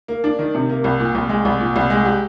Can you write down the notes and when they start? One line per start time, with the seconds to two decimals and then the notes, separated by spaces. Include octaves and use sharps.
0.08 A#3
0.24 D4
0.39 D#3
0.55 C3
0.69 A#3
0.84 C2
1.00 A#2
1.15 C2
1.29 G#3
1.45 C2
1.60 A#2
1.76 C2
1.90 G#3
2.05 G4